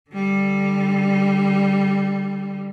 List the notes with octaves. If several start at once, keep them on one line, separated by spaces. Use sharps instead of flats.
D3 G3